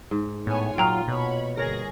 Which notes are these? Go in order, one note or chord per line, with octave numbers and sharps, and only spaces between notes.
G#2
A2 B3 C#5 G#5
A#2 F#3 F4 F5 G5 A#5 F6
B2 C#5 B5
G1 G#4 A#4 C#5 A#6